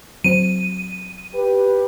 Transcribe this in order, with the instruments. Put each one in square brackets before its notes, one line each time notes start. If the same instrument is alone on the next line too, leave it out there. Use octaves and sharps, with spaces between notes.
[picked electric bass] F#3 C4 [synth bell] D#7
[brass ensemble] G4 B4